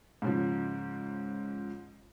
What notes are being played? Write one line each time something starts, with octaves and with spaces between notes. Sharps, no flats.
G#2 C#3 F3